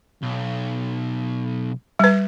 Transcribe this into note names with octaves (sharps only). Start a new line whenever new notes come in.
B1
G3 B4